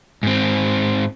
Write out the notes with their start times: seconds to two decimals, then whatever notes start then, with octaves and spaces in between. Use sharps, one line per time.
0.23 G#2 C4